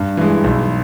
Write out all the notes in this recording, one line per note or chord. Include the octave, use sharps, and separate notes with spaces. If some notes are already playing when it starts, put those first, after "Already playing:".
Already playing: G2
E3 G#3
B1